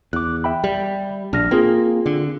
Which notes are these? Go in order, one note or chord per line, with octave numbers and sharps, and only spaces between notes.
E2 D6 F#6
E5 G5 B5
G3
A#1 D4 F6 A#6
A#3 C4 F4 G#4
D3